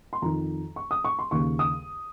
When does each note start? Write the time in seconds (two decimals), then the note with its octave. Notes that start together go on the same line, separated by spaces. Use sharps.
0.13 C6
0.22 F2 D#3 A#5
0.76 C#6
0.91 D#6
1.05 C#6
1.19 C6
1.31 D#2 C#3 C#6
1.59 D#6